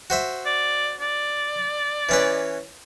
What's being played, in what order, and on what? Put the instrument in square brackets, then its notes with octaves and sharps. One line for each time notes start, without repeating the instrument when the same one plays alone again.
[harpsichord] F#4 C5 E5
[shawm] D5
D5
[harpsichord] E3 C#4 B4